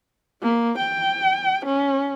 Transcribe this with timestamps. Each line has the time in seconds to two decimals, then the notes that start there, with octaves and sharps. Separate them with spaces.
0.42 A#3
0.79 G5
1.66 C#4